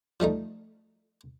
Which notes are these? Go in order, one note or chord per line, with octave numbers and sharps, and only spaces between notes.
F3 G3 A3 D#4